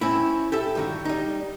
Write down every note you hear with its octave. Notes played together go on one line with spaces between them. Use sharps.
C4 C#4 E4
G4 A4 E5
G2 D#3 F#4
G3 D#4